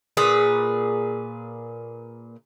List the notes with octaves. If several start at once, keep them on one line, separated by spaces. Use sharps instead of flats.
A#2 G#4 B4